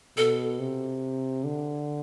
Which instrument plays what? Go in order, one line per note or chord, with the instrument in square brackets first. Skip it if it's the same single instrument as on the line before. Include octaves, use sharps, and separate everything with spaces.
[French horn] B2 [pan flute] A4
[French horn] C3
D3